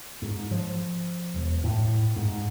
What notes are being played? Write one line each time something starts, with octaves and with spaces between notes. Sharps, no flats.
G#2
F3
E1
A2
G#2